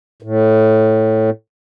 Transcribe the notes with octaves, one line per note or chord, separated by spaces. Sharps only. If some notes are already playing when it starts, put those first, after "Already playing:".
A2